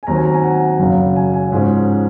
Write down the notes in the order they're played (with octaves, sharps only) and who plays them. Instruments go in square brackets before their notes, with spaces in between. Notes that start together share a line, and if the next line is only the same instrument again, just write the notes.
[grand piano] G#5
D#2 D#3 F#3 C4 A#5
G#5
A#5
G#5
F#5
F#1 F#2 C#3
G#5
G#5
G#2 F3 G#3 C#4